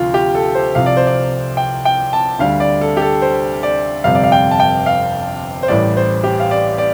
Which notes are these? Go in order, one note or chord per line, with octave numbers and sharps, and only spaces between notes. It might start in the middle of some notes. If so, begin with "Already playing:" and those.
Already playing: D2 C3 F3 F4
G4
A4
C5
C2 C3 F3 F5
D5
C5
D5
G5
G5
A5
D2 D3 G3 F5
D5
A4
G4
A4
C5
D5
G1 F2 C3 G3 F5
D5
F5
G5
A5
G5
F5
C5
A1 A2 G3 D5
C5
G4
F5
D5
D5